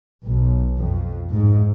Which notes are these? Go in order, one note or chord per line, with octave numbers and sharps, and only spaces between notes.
B1
F2
G#2